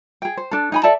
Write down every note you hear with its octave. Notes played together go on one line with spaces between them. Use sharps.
G#4 G5
C5
D4 A4
D#4 G#5 B5
A4 D5 E5 A5